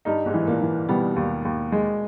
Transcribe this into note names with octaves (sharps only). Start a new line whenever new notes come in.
G2 G3 D#4
G#2 G#3
E3
A#2 A#3
E3
B2 G3 B3
D#2
D#2
G#3